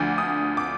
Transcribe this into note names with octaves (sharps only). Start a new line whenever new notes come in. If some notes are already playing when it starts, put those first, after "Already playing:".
Already playing: D2 D3 F3 D6
D#6
D6